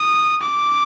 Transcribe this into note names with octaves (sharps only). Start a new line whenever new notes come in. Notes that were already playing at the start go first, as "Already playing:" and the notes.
Already playing: D#6
D6